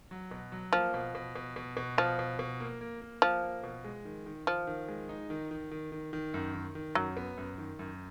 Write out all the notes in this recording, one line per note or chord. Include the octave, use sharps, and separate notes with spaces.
F#3
B2
F#3
F3 A#3
B2
B2
B2
B2
B2
B2 F3
B2
B2
A#3
A#3
A#3
F3 A#3
A#3
B2
G#3
D#3
D#3
D#3 F3
D#3
G#3
D#4
D#3
D#3
D#3
D#3
D#3
F#2
D#3
D#3
F#2 F#3
B3
F#2
D#3
F#2